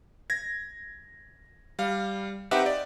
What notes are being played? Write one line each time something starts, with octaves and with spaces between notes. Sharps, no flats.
G#6 A#6
G3 F5
C4 D#4 G4 B4 E5 F#5
D5